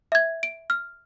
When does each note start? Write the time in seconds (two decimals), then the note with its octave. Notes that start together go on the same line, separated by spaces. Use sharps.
0.12 E5 G#6
0.43 D7
0.70 F6